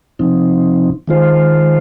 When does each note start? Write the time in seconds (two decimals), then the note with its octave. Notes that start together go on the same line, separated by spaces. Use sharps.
0.19 C3 F3 C4 D#4
1.08 D#3 G#3 F4 C5